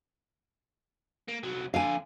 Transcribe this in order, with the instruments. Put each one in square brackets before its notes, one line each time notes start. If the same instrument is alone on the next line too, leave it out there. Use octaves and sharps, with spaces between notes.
[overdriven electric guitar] A#3
C2 F#3
[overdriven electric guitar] F2 D3 [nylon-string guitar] F5 G#5